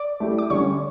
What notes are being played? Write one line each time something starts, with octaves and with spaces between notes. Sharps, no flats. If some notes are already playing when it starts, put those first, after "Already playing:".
Already playing: D5 D6
A3 E4 G4
D6
D3 G3 C#4 C#5 C#6